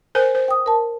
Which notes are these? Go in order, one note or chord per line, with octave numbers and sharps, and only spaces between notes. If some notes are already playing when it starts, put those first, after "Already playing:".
A#4 C5 G#5
C5
G5 D#6
A#4 A5